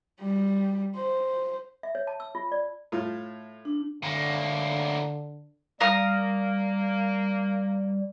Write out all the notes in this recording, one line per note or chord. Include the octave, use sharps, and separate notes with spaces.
G3
C5
E5
C#5
A5
E6
F4
D5
A2 F4
D4
A2 D3 A#3
G3 A#3 A#4 F5 D#6